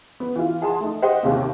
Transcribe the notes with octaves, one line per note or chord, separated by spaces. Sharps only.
B3
E3 F4
G#4 F#5 G#5 A5 C6
A3 D#4
G4 C5 D#5 F#5 G5
D#2 C3 A#3